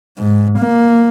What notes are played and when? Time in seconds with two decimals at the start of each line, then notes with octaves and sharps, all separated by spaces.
0.18 G#2
0.59 A#3